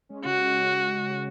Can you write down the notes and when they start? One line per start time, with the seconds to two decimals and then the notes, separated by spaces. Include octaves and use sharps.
0.09 G#3 C#4
0.25 C#3 F#4
0.42 G#3 C#4
0.58 C#3